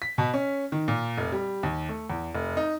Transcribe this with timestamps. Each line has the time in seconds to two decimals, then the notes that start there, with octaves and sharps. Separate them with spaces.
0.02 B6
0.18 B2
0.34 C#4
0.72 D#3
0.88 A#2
1.18 F1
1.32 G3
1.63 D#2
1.89 A3
2.10 E2
2.35 F1
2.57 D#4